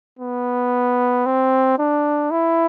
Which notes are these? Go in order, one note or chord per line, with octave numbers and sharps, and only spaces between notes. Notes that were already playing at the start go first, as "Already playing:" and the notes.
B3
C4
D4
E4